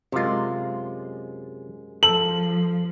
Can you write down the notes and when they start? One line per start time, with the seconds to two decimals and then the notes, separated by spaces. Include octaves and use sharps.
0.12 F#2 C3 G#3 F4
2.03 F3 A4 F#7